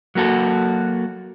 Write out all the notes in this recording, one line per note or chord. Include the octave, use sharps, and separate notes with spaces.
F#3 A#3 F#4 A4